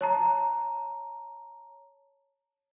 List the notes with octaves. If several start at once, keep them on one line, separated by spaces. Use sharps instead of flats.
C#5 A5 A#5